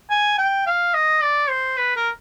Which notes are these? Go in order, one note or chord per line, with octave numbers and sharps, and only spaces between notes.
G#5
G5
F5
D#5
D5
C5
B4
A#4